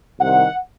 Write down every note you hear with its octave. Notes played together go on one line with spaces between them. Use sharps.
C2 C3 D#3 F#5